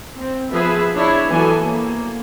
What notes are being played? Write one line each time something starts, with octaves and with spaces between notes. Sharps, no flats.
C4
F3 B3 G#4 B4 E5
D4 E4 C#5
E3 F#3 B3 A4 G#5
A#3